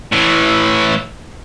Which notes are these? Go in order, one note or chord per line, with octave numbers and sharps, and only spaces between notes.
A2 E3